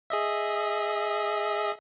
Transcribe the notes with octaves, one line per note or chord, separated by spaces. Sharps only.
G#4 D#5 E5